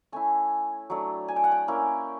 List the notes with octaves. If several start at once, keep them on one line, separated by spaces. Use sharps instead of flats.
A3 C#4 E4 G#5
F#3 A3 D4
G#5
G5
F#5
G5
A#3 C#4 E4